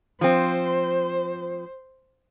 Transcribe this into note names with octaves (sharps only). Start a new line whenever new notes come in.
F3 C4 C5